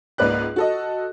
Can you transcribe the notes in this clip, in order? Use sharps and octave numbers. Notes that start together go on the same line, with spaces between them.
C#2 G#2 A#3 B4 D5 F#6
F#4 A4 D#5